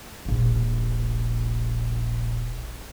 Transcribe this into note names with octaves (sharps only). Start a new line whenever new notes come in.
D#1 A#1